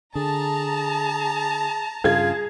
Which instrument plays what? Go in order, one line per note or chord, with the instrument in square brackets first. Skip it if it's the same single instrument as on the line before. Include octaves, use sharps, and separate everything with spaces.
[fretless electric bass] D3 [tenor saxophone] G#4 [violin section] A5 A#5
[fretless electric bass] G2 C#3 [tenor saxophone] F4 [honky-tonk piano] G#4 G#6